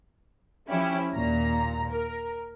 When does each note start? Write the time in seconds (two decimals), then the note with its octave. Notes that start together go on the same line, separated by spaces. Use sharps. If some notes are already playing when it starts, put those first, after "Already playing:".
0.69 F3 C#4 E4 G4
1.14 D#2 A#2 A#5
1.91 A#4